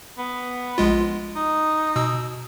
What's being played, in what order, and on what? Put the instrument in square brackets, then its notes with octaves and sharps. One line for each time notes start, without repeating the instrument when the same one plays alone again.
[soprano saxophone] B3
[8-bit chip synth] A#1 G#3 F4
[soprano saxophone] D#4
[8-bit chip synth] B2 E6